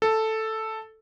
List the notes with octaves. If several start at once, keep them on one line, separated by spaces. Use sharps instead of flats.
A4